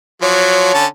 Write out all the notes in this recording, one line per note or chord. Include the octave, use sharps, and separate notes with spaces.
F3 F#3 C#5
D3 C#4 A5